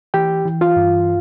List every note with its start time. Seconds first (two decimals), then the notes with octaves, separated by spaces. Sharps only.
0.14 E3 G4 G5
0.46 E3
0.61 F4 F5
0.76 G2